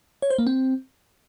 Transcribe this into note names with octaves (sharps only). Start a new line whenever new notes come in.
C#5
C5
A#3
C4